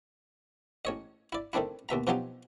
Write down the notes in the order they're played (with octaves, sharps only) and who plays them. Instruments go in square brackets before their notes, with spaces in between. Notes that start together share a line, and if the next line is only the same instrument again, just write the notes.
[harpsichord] A1 C#5 D#5
E4 D5
D#3 A3 C4 D4 E4
D#2 B2 E5 A#5
B2 F3 F#3 C4 D#4 G4